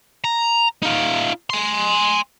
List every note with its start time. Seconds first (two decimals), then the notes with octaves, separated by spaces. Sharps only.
0.24 A#5
0.82 D#4 F4
1.50 G#5 C6